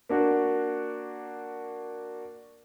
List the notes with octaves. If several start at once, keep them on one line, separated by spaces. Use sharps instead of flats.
A#3 D4 F#4